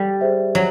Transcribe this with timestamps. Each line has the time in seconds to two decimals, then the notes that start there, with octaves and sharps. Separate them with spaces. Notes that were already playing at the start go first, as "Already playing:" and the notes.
Already playing: G3
0.21 G#4 C5 E5
0.55 F#3